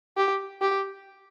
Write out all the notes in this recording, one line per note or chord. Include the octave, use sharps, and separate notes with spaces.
G4
G4